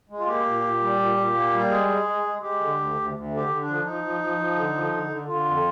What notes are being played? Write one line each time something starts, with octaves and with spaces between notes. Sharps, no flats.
G#3
F4
A#3 G4
A#2
A#2
G3
A#2
A#2
A#3
G3
G#3 G#4
G#3
G#3
G#3
G#3 G4
D3
D2
D2
D2
D3
G4
D3
D4
F3
F3 D#4
F3
F3
F3
D3
F3
D3
D3
D3 F4
F2